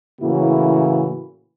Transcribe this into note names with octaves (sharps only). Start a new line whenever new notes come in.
A2 C#3 E3 A#3 E4 F#4